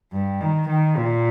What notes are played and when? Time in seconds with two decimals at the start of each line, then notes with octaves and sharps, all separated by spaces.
0.13 G2
0.41 D#3
0.69 D#3
0.97 A#2